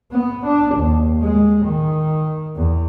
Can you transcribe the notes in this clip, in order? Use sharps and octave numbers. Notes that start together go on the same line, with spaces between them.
B3
D4
D#2
G#3
D#3
E2